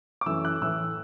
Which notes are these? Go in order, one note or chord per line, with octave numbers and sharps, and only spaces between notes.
D6
F#2 E3 A3 E6
F#6
A2 E3 A3 E6